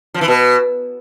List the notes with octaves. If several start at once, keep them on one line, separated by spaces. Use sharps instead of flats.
F3
E3
B2